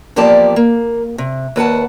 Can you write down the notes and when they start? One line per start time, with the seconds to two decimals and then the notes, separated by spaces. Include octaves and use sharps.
0.16 E2 F3 A#3 G4 D5 A5
0.56 A#3
1.18 C3
1.56 D#2 B4 F#5 A5